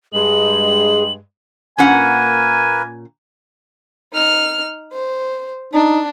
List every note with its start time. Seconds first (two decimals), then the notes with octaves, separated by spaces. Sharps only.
0.13 G2 G#3 G#4 F#7
1.78 A#2 A#3 C#4 A#4 B4 F#5 G#5
4.13 D#4 F6
4.93 C5
5.73 D4 D#4